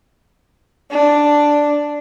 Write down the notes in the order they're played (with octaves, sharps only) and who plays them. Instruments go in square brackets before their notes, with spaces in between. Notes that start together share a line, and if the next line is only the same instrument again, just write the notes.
[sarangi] D4